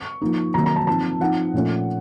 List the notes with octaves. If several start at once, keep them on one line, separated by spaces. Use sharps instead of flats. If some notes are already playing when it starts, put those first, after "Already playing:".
Already playing: C#6
F3 A#3 D#4
C3 D#3 F#3 A#3 A#5
A#5
A5
F3 C4 D#4 A5
F3 C4 D#4 F#5
A#2 F3 A3 C#4